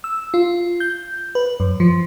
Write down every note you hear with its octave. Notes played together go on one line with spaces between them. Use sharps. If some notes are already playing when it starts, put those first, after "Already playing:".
E6
F4
G6
B4
F#2
F3